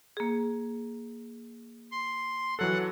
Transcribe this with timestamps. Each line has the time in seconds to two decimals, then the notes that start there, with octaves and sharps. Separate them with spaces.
0.17 A#3 G#4
1.92 C6
2.59 E3 F#3 A4 F#5